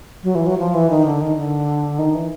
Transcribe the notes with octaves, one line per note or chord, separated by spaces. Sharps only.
F#3
E3
F#3
F3
E3
D#3
D3
D#3
D3
D#3
E3